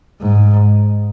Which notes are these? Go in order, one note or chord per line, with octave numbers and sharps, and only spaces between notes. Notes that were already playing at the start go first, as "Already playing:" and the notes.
G#2